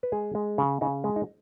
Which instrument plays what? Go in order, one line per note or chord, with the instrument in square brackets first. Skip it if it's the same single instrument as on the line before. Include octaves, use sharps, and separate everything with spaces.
[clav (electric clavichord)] B4
G#3 G#4
G#3
C#3
C#3 D#4
G#3
D#4